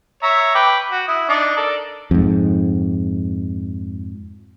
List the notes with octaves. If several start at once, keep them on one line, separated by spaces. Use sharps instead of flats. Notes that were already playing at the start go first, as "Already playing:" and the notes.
C#5 E5 A#5
B4 G5 D6
F#4
E4 D#6
D4 D#4
A4 A#4 D5
F2 G#2